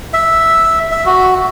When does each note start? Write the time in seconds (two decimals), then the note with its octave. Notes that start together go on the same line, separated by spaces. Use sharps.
0.13 E5
0.92 E5
1.06 F#4